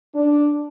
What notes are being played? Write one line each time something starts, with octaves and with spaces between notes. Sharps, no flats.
D4